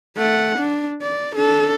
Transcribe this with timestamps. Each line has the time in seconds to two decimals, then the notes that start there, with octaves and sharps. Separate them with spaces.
0.17 A3 F#5
0.59 D4
1.02 D5
1.36 D4 A4